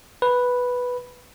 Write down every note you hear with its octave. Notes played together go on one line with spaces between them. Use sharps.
B4